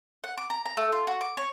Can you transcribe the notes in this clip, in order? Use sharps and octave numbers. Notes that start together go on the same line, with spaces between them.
F#5
D6
A#5
A#5
A3
F4
F#4
D6
C#5